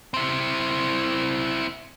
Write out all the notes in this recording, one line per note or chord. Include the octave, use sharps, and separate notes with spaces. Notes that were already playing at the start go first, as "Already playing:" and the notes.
C4 E4